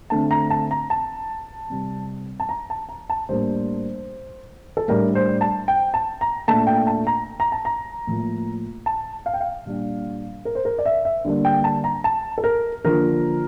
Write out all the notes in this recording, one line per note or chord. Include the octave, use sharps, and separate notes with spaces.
D3 A3 C4 A5
A#5
A5
A#5
A5
C3 G3 C4
A5
A#5
A5
A#5
A5
A2 G3 A#3 D4 C5
A4
A2 G3 D4 A#4
C5
A5
G5
A5
A#5
A#2 A3 D4 A5
G5
A5
A#5
A#5
A5
A#5
A2 F3 A#3
A5
F5
G5
F5
A#2 G3 D4
A#4
C5
A#4
D5
E5
E5
D3 G3 A#3 D4
G5
A5
A#5
A5
A4
A#4
D3 F3 A#3 A#4